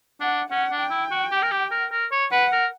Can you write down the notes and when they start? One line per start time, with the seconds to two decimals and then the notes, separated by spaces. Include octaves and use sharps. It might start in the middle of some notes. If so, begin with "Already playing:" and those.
0.20 D4 F#5
0.50 C#4 F#5
0.71 D4
0.80 G5
0.90 E4
1.11 F#4
1.31 G4
1.42 A#4
1.51 G4
1.71 A#4
1.92 A#4
2.12 C#5
2.31 B4 F#5
2.52 A#4